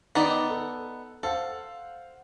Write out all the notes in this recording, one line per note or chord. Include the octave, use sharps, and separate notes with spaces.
D#3 B3 D#4 D5
A4
A4 C5 F5 F#5